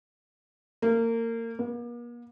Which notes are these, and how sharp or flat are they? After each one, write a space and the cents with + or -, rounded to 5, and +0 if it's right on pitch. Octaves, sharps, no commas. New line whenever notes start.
A#3 -25
A#3 +45